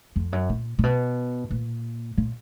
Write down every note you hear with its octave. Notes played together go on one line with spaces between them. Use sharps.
F2
F#2
A#2
A#2
B2
A#2
A#2